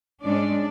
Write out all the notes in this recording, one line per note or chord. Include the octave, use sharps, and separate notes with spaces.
G#2 G#3 C#4 D4 D5